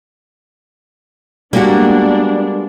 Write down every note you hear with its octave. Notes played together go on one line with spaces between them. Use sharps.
G3 G#3 A#3 B3 D4 F#4